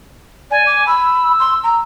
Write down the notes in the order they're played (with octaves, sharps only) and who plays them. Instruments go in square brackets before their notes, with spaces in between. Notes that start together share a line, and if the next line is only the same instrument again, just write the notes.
[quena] D5 [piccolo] G#5
[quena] D6
[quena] B5 [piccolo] E6
[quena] C6
A#5